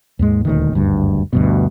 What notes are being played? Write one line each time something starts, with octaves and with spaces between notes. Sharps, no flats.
D#2 G#2 G#3
D#1 D2 D#3
F#1 D2 G2
D2 G2 B2